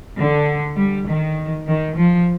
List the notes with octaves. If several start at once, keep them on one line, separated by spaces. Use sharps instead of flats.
D3
G3
D#3
D#3
F3